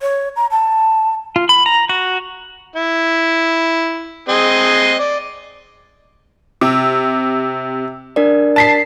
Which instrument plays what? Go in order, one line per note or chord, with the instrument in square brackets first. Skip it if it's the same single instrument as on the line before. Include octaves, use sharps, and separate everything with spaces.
[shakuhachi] C#5
A#5
A5
[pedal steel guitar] F4
B5
A#5
F#4
[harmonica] E4
C4 G#4 D#5
D5
[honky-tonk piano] C3 [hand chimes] D6 E6
[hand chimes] D4 A#4 D5
[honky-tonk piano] A5 B6 C7